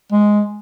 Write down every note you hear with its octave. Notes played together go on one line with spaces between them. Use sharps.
G#3